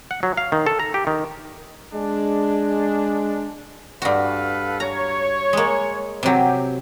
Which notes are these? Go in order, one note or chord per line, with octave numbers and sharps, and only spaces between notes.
F#5
F#3
F5
D#3
A4
A#5
G4
D#3
G#3 D4
G2 F#4 A4 B4 F5
C#5 A#5
G#3 A#3
C3 F#3 G4